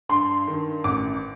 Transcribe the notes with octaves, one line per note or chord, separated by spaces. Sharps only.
G2 C6
D#3
A1 D6